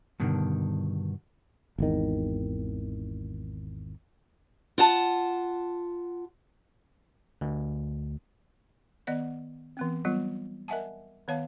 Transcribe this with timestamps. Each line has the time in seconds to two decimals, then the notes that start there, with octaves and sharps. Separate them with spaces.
0.20 G2 B2 D3 D#3
1.78 G#1 E2 D#3
4.78 F4 F#5 A5
7.41 D2
9.07 D#3 B3 D5 D#5 F#5
9.77 E3 B3 C4
10.05 F#3 G3 B3 F4
10.68 A#4 D#5 E5 F#5 G#5 A5
11.28 D#3 B3 C#5 F5 A5